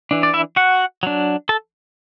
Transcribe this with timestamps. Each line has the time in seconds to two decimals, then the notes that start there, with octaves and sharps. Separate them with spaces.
0.11 E3 D4
0.23 D5
0.34 E4 E5
0.56 F#4 F#5
1.03 F#3 D4
1.49 A4 A5